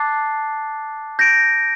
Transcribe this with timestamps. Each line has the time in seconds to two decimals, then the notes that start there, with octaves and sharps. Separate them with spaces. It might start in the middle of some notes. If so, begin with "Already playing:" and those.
Already playing: A5 D6 F#6 A6 C7
1.19 G6 A#6 D7